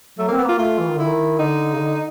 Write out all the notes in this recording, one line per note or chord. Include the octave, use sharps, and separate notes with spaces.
F#3 A3
A#3 C4
B3
A#3 F4
A3 F4
E3
D#3
D3 E4
D#3
D3 D#4
C#3
D3